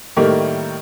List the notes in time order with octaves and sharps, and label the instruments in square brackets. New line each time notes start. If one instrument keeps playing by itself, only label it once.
[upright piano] A2 D#3 G3 A3 A#3